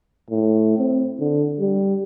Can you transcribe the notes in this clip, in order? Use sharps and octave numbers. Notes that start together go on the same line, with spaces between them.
A2
C4
D3
G3